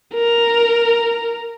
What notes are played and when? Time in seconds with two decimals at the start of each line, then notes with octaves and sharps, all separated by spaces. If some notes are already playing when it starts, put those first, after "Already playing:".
0.15 A#4